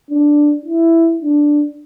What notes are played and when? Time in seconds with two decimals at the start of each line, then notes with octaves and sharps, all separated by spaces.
0.10 D4
0.66 E4
1.22 D4